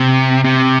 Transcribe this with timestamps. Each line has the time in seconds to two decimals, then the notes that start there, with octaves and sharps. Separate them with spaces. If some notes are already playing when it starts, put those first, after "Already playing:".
Already playing: C3
0.44 C3